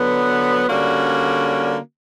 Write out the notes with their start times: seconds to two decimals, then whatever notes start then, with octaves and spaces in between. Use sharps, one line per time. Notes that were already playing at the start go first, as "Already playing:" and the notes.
Already playing: D3 F#3 B3
0.67 D3 G3 A#3 C#4 F#4